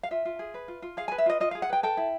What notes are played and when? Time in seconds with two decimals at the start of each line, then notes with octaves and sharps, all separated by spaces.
0.03 F5
0.11 F4 E5
0.25 F4
0.39 G#4
0.54 B4
0.68 F4
0.82 F4
0.97 G#4 F5
1.08 B4 G#5
1.18 E5
1.26 F4 D#5
1.40 F4 D#5
1.51 G#4 F5
1.62 F#5
1.70 B4 G5
1.83 A4 G5
1.97 E4